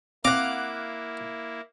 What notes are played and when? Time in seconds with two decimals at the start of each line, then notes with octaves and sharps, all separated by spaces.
0.25 A#3 C4 E4 F5 F#5 D6 A#6